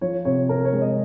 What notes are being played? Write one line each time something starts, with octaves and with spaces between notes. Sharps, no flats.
F3 C#5
C3 C#5
C3 A#4
C#5
G#3
D#5